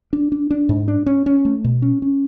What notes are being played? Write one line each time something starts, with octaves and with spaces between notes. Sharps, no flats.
D4
D4
D4
G#2
D4
C#4
C#4
A3
B2
C#4
C#4